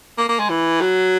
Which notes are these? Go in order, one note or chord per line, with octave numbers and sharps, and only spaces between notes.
A#3
A#3
G#3
E3
F#3